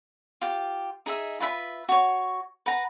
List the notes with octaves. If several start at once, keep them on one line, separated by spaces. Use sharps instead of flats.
F4 G4
D#4 G#4 D#5 E5
F4 B4 E5 B5
F#4 C#5
B4 F#5 A#5